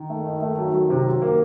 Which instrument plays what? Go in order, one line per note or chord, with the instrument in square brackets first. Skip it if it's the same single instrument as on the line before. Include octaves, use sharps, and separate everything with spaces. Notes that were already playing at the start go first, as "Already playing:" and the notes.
Already playing: [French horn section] D#3
[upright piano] A3
D#4
A3
F#3
F#3
C3
F#3
A#3